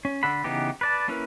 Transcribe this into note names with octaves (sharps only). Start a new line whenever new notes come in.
C#4
D3 A4 F#5 B5
C#3 E3 B3 D#4 G4
B4 D5 A5
A#3 C#4 E4 A#4 B4